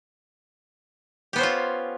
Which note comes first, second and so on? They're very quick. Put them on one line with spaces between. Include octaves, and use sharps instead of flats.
G4 B3 C5 C#4 F4